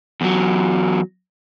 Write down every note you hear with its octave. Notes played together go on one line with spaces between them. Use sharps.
E2 F#3